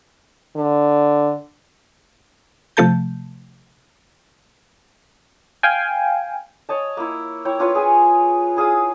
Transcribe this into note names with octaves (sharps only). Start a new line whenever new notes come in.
D3
C3 F3 A3 A5 G6
F5 G5 G#5
C#5 D#5 A5
A#3 E4
E4 C#5 G5
D4 F4 B4 C#5
G#4 B4 G#5 D#6
E4 G#4 F5 D#6